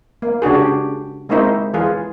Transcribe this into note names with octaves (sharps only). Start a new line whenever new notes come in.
A#3
C#3 D4 F#4 G#4
G4
G#3 A#3 C4 D#4 E4 C5
E3 F4 G#4